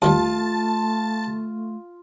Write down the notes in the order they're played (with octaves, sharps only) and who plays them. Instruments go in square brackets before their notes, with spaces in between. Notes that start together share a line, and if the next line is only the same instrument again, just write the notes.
[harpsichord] D#2 D#3 G3 [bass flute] A3 [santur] F4 [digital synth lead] A5